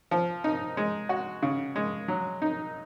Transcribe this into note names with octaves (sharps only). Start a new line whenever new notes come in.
F3
D#4
G#3
F#4
C#3
G#3
F#3
D#4